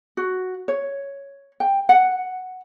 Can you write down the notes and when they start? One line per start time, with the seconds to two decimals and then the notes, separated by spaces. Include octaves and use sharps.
0.17 F#4
0.68 C#5
1.60 G5
1.89 F#5